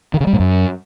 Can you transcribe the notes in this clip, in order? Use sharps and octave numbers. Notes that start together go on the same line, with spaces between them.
D#3
C#3
G3
A2
F#2